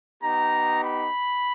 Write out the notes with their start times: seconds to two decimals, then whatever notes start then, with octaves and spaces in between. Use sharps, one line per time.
0.23 B3 D#4 G4 A#5
0.85 B5